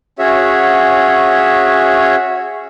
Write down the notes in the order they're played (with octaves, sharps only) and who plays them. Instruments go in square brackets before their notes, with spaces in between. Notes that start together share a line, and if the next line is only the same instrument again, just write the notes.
[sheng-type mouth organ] C#4 F#4 G#4 C#5 E5